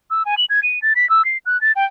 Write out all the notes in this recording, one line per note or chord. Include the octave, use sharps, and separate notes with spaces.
E6
G#5
F#7
G#6
D#7
A6
B6
E6
C7
F#6
A6
G5